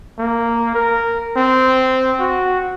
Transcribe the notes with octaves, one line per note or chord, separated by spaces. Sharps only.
A#3
A#4
C4
F#4